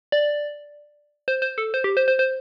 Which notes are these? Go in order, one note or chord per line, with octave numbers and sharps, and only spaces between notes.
D5
C5
C5
A4
C5
G4
C5
C5
C5